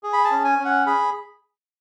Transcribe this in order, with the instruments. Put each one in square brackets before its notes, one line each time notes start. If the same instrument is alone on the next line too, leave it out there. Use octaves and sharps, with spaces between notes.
[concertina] G#4
B5
A5
C#4
G#5
C#4
F#5
G#4 B5